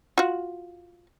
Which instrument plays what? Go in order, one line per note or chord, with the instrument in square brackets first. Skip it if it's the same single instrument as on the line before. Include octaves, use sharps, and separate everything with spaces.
[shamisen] F4 F#4